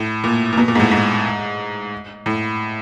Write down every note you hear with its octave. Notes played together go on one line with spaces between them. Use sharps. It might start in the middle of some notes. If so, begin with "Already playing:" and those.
Already playing: A2
A#2
A#2
B2
A#2
G#2
A2
G#2
A2